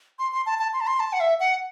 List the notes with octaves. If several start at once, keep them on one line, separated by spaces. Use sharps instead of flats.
C6
C6
A5
A5
C6
A5
C6
A5
F#5
E5
F#5